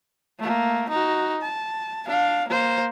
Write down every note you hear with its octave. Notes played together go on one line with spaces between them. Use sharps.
A3 A#3
D#4 F#4
A5
D4 F5
A#3 C5